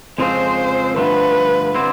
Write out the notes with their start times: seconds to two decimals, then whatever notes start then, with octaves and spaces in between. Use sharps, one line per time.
0.18 F2 C#3 F3 G#3 C4 C5
0.96 G2 D3 F3 A3 B4
1.75 D3 G3 C4 E4